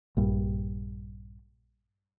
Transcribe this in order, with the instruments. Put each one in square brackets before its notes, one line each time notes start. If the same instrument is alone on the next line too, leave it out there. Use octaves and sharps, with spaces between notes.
[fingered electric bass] A#1 G2